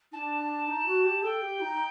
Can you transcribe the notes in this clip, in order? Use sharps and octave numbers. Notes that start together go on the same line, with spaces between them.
D4 D#4 A5
D#4
F#4
G4
A4 G5
G4
D#4